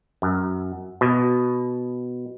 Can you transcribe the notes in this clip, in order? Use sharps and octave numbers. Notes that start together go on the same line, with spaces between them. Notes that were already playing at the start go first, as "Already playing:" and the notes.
F#2
B2